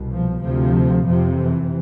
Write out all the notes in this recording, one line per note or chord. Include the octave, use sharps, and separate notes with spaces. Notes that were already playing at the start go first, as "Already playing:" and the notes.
Already playing: C2 B2
F3
D2 C3 F3
F2 C3 F3
E3